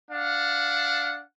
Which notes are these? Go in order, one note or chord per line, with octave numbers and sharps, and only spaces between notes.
D4 F5 F#5